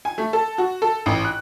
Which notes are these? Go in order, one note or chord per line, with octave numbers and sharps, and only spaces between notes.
G#5
A3
A4
F#4
A4
A1
F#6